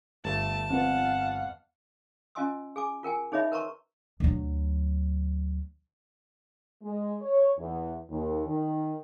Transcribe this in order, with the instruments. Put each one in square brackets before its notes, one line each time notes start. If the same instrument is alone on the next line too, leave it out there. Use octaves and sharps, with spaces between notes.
[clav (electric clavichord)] G1 [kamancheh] A3 [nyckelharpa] A5
[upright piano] F2 B3 [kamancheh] F5 F#5
[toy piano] C#4 F4 D#5 G#5 C6 E6
G#4 G#5 D6
F4 A#4 G5 G#5
D#4 G#4 C#5 D#5 E5 B5
A#4 B4 A5 A#5 C6 C#6
[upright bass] D2 F#3
[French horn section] G#3
C#5
E2
D#2
D#3